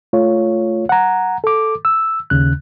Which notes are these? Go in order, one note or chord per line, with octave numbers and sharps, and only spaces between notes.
A3 F4 C#5
F#5 A#5
A4 D6
E6
D#2 C#3 F#6